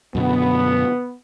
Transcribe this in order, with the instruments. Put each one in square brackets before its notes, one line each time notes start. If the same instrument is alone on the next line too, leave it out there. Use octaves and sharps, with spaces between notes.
[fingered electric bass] F#2 B2 D3 [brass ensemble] B3